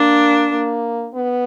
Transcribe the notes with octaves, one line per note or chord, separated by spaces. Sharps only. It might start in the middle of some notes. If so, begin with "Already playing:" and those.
Already playing: A#3 D4
A#3
B3